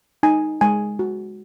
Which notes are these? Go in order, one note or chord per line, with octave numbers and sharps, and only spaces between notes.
D#4 G#5
G#3 G#5
F#4